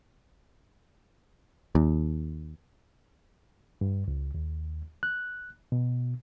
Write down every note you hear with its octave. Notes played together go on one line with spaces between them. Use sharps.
D#2
G2
C#2
D#2
F#6
B2